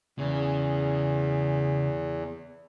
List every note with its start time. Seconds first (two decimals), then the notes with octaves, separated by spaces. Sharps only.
0.19 E2 C#3